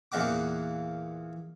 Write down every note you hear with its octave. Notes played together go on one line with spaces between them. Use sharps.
E2 A#2 A#3 F#5 D6